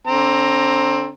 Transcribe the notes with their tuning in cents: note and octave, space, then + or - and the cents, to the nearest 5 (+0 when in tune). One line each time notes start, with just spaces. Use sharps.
D3 -15 C4 +20 A#5 +0